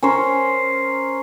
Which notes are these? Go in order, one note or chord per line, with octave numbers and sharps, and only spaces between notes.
C#4 A#4 C5